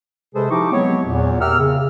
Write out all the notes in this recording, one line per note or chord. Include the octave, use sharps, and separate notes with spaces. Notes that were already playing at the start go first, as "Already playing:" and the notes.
C3 G#3 G#4 A4 B4 C5
F3 D#4 E4 G4 C#6 D6
F#3 G#3 B3 C4 C#5
E2 A#2
G4 A#4 E5 F#5 E6 F6
C#3